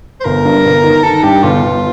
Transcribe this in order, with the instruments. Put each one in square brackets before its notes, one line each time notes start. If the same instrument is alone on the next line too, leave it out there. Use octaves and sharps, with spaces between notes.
[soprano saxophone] C5
[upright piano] G1 [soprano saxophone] A#4
[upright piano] G2
G1
D#3
[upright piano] D#3 [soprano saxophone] A4
[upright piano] G2 [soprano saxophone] G4
[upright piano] G1 [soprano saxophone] F4
[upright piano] G1